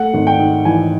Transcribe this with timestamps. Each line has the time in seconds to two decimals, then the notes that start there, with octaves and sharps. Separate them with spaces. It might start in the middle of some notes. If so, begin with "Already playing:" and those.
Already playing: A3 F#5
0.14 G#1
0.27 G5
0.39 G#2
0.65 E3 G#5